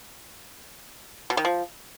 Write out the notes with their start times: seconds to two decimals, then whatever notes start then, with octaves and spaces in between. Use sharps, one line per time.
1.30 B2
1.37 D#3
1.45 F3